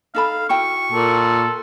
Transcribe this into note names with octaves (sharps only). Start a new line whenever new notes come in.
D#4 A4 F5 B5
E4 F#4 G5 C#6
A#2 A4